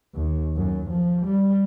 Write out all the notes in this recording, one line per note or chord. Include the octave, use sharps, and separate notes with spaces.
D#2
F#2
F3
G3